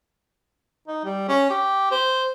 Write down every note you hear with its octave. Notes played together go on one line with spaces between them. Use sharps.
D#4
G3
C#4
G4
C5